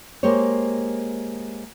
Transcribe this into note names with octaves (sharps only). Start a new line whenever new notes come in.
G#3 A#3 G4 C5 C#5